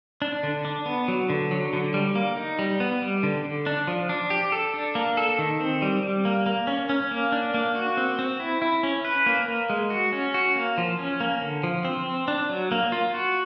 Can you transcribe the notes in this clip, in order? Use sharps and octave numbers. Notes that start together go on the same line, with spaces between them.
D4
D3
D4
B3
F#3
D3
F#3
D3
G3
A#3
D#4
G3
B3
G3
D3
D3
D4
F3
D4
G4
A4
D4
A#3
A4
D#3
C4
G3
G3
A#3
A#3
C#4
C#4
A#3
D4
A#3
F#4
C4
C4
E4
E4
C#4
B4
A#3
A#3
G#3
F#4
C#4
F#4
A#3
F3
C#4
A#3
D3
F3
C4
C4
D4
F#3
A#3
F4
F#4